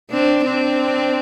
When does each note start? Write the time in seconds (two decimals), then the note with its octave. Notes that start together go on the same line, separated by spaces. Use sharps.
0.11 C4 D4
0.45 C4 D4